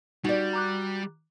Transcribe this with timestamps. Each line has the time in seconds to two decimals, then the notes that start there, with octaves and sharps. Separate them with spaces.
0.25 G3 D#4 F#4 D5
0.53 A#5 D6 F#6